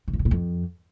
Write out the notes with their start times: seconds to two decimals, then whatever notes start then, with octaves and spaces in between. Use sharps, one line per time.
0.08 C#3
0.13 G2
0.19 C3
0.25 A#2
0.31 F2